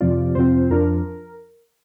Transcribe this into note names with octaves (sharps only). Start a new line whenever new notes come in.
F2 C3 F3 C4 F4 D5
F2 C3 F3 C4 F4 C5
F2 F3 D4 F4 A#4